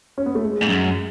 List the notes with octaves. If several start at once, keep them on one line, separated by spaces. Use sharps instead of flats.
C#4
B3
A3
G#3
G#2
F#2